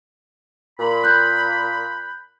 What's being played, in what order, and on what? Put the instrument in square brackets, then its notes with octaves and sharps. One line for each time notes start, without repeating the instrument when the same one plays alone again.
[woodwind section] A#2 B5
[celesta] F#6 G6